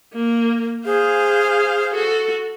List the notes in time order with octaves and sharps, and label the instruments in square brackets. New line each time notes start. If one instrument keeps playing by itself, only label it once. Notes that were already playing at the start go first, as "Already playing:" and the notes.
[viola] A#3
[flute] G#4 [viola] C5 F5
[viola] F#4 A4